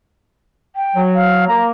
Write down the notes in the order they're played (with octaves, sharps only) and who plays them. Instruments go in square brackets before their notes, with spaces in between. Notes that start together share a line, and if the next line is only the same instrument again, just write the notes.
[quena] G5
[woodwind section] F#3
[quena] F5
[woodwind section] A#3 [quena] A#5